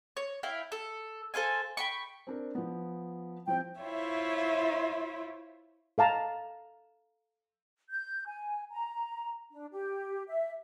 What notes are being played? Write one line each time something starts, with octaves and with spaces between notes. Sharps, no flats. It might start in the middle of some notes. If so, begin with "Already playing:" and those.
C#5
E4 F5 G5
A4
A4 C5 F5 G#5
G5 B5 C#6
C4 D4 A#4
F3 B3
F3 C4 G5
E4 F4 C5 C#5 E5
A4 F5 A5 A#5
G6
G#5
A#5
D4
G4
E5